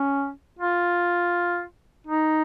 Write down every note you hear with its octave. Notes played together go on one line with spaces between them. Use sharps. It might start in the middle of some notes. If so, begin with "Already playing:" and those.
Already playing: C#4
F4
D#4